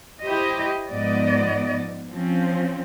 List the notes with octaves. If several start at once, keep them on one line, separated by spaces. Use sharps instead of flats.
E4 G4 C5 D#5
G#2 F3 B3 D5 D#5
F3 C4 C#4